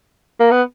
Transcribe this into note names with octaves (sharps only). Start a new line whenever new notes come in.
A#3
B3